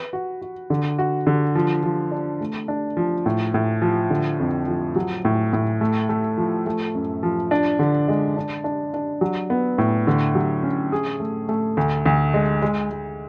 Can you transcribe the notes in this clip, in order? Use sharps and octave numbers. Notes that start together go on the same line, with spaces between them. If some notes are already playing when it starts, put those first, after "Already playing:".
Already playing: B4
F#4
F#4
D3
F#4
D3
F3
F3
D4
A3
D4
F3
A2
A2
F3
D3
F2
F3
F#3
A2
A2
A3
A3
F3
A3
F#2
F3
D4
D3
G#3
D4
D4
D4
F#3
B3
A2
D3
F#3
C#4
G#4
A3
A3
D2
D2
G#3
G#3
G#3